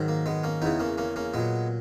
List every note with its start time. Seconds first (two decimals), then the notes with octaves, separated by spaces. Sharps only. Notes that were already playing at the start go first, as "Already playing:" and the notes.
Already playing: G#2 D#3 F#3
0.08 A#3
0.26 G#3 B3
0.44 A#3 C#4
0.62 E2 C#3 E3 B3 D#4
0.80 A#3 C#4
0.98 A#3 C#4
1.16 A#3 C#4
1.34 A#2 F#3 G#3 B3